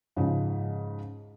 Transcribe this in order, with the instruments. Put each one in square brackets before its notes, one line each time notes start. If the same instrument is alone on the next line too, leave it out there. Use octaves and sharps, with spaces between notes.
[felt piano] G#2 C#3 F3 G#3